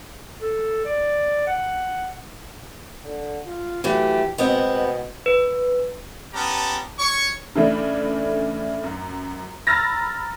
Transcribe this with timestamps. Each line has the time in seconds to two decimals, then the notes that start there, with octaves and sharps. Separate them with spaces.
0.41 A4
0.85 D5
1.47 F#5
3.05 D3
3.47 F4
3.84 E3 F#3 A3 G4
4.38 B2 G#3 B3 C4
4.68 B2
5.26 B4
6.34 B3 C#4 G4 A5 A#5
6.99 C#5 C#6
7.55 C#3 E3 A3 D4
8.84 F#2
9.67 A#5 B5 E6 F6 A6 A#6